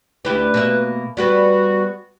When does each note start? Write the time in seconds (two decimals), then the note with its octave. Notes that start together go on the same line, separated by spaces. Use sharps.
0.25 D2 E4 G4 B4
0.54 B2 A#3 E5
1.17 G3 B3 F#4 B4